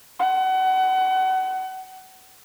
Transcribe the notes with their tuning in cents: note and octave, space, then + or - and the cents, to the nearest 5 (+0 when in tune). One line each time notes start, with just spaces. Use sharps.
F#5 +30